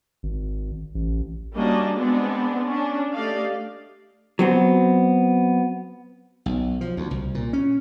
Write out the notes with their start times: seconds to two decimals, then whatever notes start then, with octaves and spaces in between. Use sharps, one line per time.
0.23 G#1
0.95 A1
1.54 G3 A#3 C#4 D4 F#4 D#5
1.95 G#3 B3 C4 D4 D5
2.64 C#4 D4
3.14 A3 D4 G4 D5 D#5 F5
4.39 F#3 B3 C4
6.46 B1
6.81 F3
6.97 D2
7.11 C2
7.35 A#2
7.53 C#4